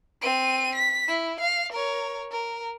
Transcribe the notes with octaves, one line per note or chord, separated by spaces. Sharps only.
C4 D#7
B6
E4
F5
A#4 C#5
A#4